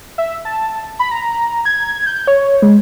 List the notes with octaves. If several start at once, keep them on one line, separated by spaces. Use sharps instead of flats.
E5
A5
B5
A#5
G#6
G6
C#5
G#3